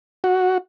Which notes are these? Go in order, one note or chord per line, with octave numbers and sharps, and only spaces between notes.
F#4